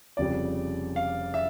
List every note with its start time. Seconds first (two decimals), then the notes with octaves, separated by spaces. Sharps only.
0.17 F1 F2 C#3 G3 D5
0.96 F5
1.34 E5